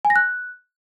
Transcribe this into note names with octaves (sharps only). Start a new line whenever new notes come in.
G#5
A#6
F#6